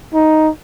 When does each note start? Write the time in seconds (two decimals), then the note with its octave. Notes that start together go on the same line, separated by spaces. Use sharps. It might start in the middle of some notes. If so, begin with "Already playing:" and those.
0.14 D#4